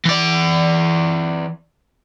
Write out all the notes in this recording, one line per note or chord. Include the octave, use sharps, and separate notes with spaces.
E3 D5